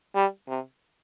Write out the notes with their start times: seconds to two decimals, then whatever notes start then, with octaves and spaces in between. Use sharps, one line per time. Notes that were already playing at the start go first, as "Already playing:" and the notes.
0.15 G3
0.48 C3